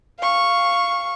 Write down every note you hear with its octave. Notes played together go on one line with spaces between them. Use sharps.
F5 C#6